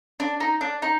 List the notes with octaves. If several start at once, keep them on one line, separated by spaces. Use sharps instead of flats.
D4
D#4
D4
D#4